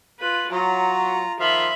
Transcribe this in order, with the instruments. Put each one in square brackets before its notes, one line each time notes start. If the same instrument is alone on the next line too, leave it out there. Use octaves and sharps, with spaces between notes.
[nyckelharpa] F4 B4
[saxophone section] F#3 [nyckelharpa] F4 A#5
[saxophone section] D#3 F3 F4 [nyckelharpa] E5 B5